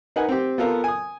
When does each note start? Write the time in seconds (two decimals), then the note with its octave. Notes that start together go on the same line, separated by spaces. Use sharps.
0.16 D#4 A#4 B4 F#5 G#5
0.29 C4 G4
0.58 B3 F4 A4 A#4 F5
0.84 G#5 D#6